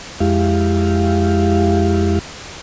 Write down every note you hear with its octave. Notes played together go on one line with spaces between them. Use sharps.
F2 G#3 E4 G4 F5